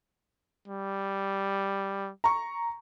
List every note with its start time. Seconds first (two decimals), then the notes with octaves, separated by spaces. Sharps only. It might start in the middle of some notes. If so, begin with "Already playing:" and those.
0.68 G3
2.24 A#5 C#6